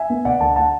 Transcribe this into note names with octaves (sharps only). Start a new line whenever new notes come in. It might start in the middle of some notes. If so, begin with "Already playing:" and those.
Already playing: E5 G#5
B3
D3 D5 F#5
D2 F#5 A5
F#5 A5